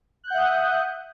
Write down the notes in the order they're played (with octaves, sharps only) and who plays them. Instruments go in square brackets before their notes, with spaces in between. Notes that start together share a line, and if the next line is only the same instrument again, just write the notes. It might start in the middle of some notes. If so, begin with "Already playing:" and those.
[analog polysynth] F#6
G6
F#5
E5
D#6